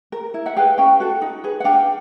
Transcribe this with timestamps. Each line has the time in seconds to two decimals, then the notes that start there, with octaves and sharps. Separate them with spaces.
0.12 A#4
0.34 E4
0.46 E5 F#5
0.56 G#4 B4 F5 G5
0.78 C#4 F5 G5
1.00 F#4 A4
1.22 D#4
1.44 G#4 B4
1.60 F#5
1.64 D4 F5 G5